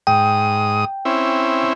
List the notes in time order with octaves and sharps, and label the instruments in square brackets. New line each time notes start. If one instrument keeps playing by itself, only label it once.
[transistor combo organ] G#2 D#6 [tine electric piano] G5
[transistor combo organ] C4 C#4 E4